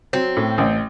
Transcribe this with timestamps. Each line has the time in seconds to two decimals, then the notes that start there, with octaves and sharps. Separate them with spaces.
0.13 F#3 C4
0.36 A2
0.58 A1